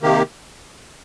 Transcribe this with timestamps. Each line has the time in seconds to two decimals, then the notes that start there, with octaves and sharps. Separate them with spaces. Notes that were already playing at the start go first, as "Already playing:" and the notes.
0.02 C3 D#3 A#3 G4